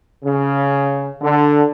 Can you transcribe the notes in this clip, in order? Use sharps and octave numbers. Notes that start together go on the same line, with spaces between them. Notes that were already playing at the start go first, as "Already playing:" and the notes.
C#3
D3